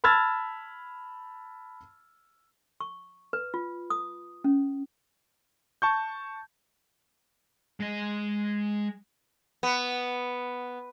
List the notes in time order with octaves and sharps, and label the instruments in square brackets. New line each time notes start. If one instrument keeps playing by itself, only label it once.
[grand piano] A5 B5 E6 F6 G#6 A6
[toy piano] C#6
B4
F4
D#6
C#4
[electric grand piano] A5 C#6 G6
[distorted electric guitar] G#3 D#5
[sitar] B3